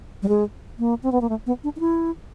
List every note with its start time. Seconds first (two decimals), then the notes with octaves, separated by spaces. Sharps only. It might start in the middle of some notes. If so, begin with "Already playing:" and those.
0.23 G3
0.28 G#3
0.79 A#3
1.03 C4
1.12 B3
1.21 A#3
1.29 A3
1.46 B3
1.64 D4
1.76 D#4
1.80 E4